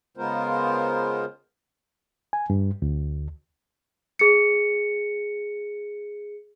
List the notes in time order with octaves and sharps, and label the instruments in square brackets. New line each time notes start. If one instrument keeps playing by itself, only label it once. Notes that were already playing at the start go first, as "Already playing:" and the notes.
[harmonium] C#3 G#3 B3 F4 A#4 C5
[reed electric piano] G#5
G2
D2
[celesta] G#4 C#7